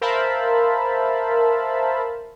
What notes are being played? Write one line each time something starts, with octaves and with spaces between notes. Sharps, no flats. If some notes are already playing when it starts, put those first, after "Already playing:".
A#4 C5 E5 F5 A5 B5